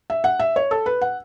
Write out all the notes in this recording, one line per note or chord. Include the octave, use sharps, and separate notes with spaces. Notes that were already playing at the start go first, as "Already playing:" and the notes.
E5
F#5
E5
C#5
A4
B4
F#5